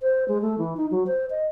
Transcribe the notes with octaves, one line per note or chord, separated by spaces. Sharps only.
C5
G#3
A3
E3
D#4
F#3
C5
D#5